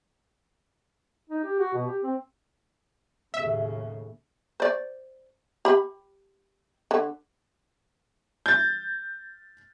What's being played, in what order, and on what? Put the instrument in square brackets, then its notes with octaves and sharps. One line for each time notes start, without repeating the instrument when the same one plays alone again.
[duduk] D#4
G4
F#4
B2
G4
C4
[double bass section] D#2 A2 C#3 [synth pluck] E5
[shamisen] C5 D5
G4 B5
D3
[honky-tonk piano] G6 A6